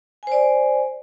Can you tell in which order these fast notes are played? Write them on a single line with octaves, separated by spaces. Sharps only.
G#5 C5 D5